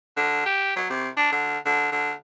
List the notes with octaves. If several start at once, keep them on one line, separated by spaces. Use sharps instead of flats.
D3
G4
F#3
C3
D4
D3
D3
D3